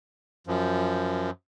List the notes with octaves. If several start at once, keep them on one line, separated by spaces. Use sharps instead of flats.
F#2 F3